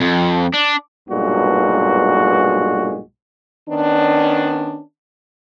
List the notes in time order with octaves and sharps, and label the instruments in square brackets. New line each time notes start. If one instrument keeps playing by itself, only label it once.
[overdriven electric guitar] F2
D4
[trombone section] B1 G2 A#2 G#3 F#4
[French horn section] D#3 B3 C#4 D4